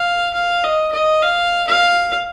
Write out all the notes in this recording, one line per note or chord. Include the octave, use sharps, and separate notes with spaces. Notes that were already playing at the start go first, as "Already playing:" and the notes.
Already playing: F5
F5
D#5
D#5
F5
F5